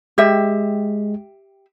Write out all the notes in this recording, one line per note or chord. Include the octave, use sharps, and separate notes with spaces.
G#3 G4 E5